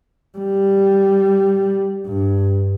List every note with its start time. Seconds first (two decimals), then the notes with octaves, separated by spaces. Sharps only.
0.38 G3
2.06 G2